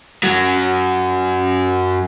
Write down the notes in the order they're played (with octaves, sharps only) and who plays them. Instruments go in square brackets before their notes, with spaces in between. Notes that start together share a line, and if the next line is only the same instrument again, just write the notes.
[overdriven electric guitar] F#2 F#3